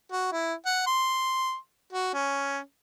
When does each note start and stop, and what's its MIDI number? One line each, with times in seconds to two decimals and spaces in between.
0.12 0.29 66
0.32 0.53 64
0.66 0.83 78
0.87 1.55 84
1.93 2.11 66
2.14 2.59 61